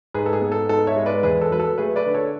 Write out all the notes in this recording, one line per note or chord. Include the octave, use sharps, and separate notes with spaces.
G#2 G#4 B4
A4
G#4
B3
A4
G#2 A4
C#5 E5
G#3
B4 D5
E2 G#4 B4
A4
F#3 B4
A4
A3 G#4 B4
B4 D5
D3
A4 C#5